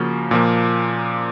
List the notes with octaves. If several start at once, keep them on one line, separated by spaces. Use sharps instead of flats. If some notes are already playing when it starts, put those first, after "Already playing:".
Already playing: C#3 F3 A#3 C#4 F#4
A#2 F3 A#3